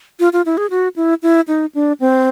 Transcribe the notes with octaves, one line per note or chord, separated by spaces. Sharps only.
F4
F4
E4
G#4
F#4
E4
E4
D#4
D4
C4